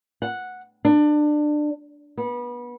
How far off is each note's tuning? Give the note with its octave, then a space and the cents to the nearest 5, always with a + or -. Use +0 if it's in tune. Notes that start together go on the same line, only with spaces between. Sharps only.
F#5 -5
D4 +25
B3 -25